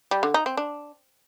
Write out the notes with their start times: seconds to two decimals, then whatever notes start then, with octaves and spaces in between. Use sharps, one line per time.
0.11 G3
0.23 D3
0.34 D#4
0.46 C4
0.57 D4